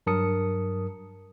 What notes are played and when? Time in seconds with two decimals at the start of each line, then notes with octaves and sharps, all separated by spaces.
0.07 G2 F#3 A#4 A5 D#6 C#7